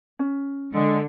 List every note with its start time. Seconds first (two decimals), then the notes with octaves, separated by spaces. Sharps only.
0.19 C#4
0.73 D3 G#3